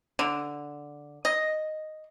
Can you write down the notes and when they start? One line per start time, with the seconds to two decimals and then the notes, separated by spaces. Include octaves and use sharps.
0.19 D3
1.25 D#5